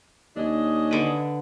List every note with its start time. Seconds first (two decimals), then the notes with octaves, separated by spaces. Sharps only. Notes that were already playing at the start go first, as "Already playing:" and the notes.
0.36 D#2 C#4 D4 D#5
0.91 D3 B4